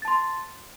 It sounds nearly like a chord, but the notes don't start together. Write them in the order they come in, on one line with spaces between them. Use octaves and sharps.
A6 A5 C6